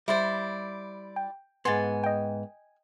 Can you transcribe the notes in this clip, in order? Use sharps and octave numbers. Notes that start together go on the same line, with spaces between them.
G3 E4 C5 D5
G5
G#2 B3 G#5 C6 A6
D#5 G5